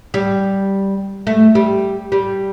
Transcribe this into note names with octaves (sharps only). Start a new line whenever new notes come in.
G3
A3
G3
G3